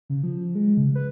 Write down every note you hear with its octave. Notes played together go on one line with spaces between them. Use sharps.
C#3
F3
F3
G#3
C#3
B4